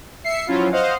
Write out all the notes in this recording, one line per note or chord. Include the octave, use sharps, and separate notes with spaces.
E5 C7 C#7
F3 F#3 C#4 E4 F4
C5 D#5 F5 F#5